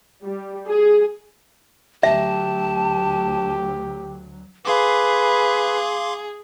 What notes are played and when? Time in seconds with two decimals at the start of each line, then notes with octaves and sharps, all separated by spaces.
0.23 G3
0.69 G#4
2.03 D2 F#3 G4 E5 A5
4.65 G#4 B4 F5 C6 D6